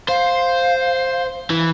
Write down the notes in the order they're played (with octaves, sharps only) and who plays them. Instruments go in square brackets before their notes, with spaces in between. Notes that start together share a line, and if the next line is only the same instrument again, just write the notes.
[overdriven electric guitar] C5 [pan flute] F5
[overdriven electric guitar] E3